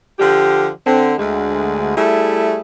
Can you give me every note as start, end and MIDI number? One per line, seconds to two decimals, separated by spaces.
0.19 0.68 50
0.19 0.68 53
0.19 0.68 67
0.87 1.13 50
0.87 1.13 60
1.18 1.94 38
1.18 1.94 56
1.96 2.59 55
1.96 2.59 57
1.96 2.59 64
1.96 2.59 68